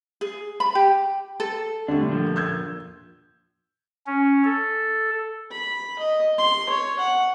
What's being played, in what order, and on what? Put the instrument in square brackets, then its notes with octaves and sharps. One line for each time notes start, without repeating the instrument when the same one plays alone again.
[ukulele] G#4
B5
G4
A4
[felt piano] D3 G3 A3 [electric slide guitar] D4
[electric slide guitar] A#2 F3
[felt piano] E6 G6 G#6
[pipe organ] C#4
A4
[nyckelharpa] B5
D#5
C6
C#5
F#5